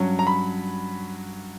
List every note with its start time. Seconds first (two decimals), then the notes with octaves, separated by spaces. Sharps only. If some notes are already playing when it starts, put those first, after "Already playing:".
Already playing: G2 F#3 C#4
0.19 A#5
0.27 B5